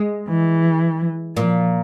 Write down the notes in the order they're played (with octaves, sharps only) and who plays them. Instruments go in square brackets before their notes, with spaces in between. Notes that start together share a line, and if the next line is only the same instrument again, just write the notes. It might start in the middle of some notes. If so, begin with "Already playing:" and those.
Already playing: [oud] G#3
[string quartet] E3
[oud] A#2 [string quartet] F3